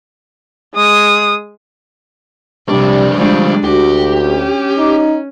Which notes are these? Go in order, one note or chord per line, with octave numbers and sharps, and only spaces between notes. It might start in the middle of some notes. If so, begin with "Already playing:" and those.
G#3 D#6
F2 C3 G3 D4
D2 F3 G3 G#3 D4
D2 F#4 G4
C#4
D#4